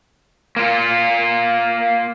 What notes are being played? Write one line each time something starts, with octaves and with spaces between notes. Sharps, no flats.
A#3 F4